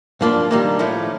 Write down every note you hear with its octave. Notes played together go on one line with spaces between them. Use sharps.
G2 F3 A#3 D4 F4
D#3 G3 A#3 D4
A2 F3 A3